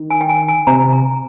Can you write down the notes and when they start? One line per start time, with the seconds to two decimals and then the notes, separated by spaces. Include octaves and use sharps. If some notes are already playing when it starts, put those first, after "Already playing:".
Already playing: D#3
0.10 G#5
0.21 G5
0.30 G#5
0.48 G#5
0.67 C3 A#5
0.93 A#5